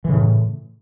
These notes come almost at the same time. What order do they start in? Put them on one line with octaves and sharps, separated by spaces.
E3 C#3 A2